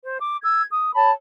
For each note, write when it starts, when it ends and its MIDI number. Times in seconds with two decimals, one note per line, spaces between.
0.03 0.17 72
0.20 0.38 86
0.42 0.62 88
0.42 0.62 92
0.71 0.94 87
0.95 1.10 73
0.95 1.10 81
0.95 1.10 83